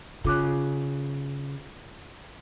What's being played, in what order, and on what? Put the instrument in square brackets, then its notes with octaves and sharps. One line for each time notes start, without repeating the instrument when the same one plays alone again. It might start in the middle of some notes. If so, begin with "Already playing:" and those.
[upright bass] C#3 [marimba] F4 D6 F#6